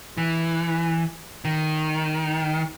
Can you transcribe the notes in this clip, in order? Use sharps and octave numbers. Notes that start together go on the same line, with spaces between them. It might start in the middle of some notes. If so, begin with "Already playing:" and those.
E3
D#3